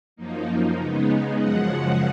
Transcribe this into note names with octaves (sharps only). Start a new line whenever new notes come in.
F#2 F3 A#3 D#4
C#3 G#3 B3 D#4
F#2 C#3 F3 G#3 F#5